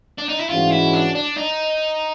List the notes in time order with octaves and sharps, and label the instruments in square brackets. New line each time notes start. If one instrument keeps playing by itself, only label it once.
[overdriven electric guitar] D4
D#4
E4
[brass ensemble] G#2 E3 G#3 C#4 F#4 [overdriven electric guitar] F4
[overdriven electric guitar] E4
D4
D4
D#4